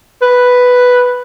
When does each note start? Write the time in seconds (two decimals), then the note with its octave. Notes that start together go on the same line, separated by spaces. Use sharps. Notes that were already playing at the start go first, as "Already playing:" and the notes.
0.22 B4